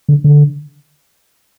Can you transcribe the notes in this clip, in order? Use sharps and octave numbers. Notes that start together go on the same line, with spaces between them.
D3
D3